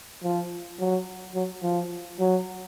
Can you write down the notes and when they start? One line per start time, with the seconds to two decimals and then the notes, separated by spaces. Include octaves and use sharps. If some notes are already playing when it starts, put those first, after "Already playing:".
0.23 F3
0.79 F#3
1.35 F#3
1.63 F3
2.20 F#3